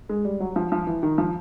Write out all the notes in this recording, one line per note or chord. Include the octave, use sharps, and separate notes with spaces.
G#3
G3
F#3
F3
F3
E3
D#3
F3